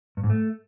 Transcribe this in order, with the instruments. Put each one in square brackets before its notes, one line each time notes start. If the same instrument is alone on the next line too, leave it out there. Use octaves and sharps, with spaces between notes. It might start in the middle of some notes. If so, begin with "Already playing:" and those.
[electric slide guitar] G2
G#2
A3